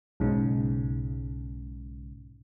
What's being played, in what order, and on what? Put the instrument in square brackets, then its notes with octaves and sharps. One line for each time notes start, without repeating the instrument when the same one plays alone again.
[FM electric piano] B1 G#2 C#3